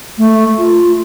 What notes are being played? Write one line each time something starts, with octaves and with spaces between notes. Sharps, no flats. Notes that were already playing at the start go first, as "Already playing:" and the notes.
A3
F4